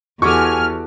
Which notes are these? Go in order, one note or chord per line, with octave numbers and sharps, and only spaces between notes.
E2 F#4 G4 A4 G#5 C#6 D6 F6